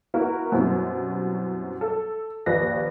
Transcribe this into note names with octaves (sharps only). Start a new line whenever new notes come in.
B3 E4 F#4 A#4
F#2 B2 G3 C4 E4
A4
A#1 D#2 F3 B4 A#6